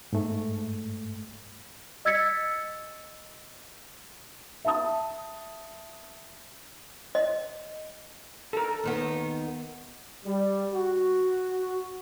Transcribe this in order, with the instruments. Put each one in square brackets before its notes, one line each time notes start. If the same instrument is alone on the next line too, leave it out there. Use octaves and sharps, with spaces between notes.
[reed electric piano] G#2 A3
[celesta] D#5 E6 G#6 A6 B6 C#7
[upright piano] E5 A5 D#6
[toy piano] D#5
[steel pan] A4 A#4
[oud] D#2 D#3 B3
[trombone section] G3
F#4